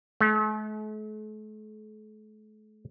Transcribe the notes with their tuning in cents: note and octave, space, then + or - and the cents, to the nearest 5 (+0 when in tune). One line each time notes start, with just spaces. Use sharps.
A3 -45